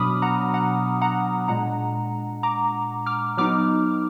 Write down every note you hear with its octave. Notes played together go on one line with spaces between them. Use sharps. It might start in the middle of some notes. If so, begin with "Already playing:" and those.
Already playing: B2 F#3 B3 D4 B5 D6 D#6 F6
F#5 A#5
F#5 A#5
F#5 A#5
A#2 G#3 D4 F#5 A#5
A#5 D6
D6 F6
F#3 B3 D#4 D6 F6